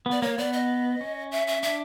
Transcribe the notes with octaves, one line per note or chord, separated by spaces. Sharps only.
B3
D5
A#3 C#5
B3 D5
D#5
C#4
E5
E5
D4 E5